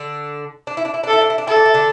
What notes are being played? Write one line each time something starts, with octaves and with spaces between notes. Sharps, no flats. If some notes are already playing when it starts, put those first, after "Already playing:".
Already playing: D3 D4
D4
E4
D4
E4
D4
A4
E4
D4
E4
D4
E4 A4
D4
E4
D3 D4